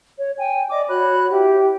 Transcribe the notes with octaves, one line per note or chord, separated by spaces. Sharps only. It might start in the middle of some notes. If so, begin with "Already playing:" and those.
C#5
G5 G#5
D5 D#5 D6
F#4 C#5 B5 F#6
E4 G4